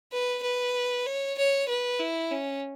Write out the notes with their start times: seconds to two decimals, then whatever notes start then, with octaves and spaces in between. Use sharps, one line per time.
0.12 B4
0.43 B4
1.06 C#5
1.38 C#5
1.69 B4
2.00 E4
2.32 C#4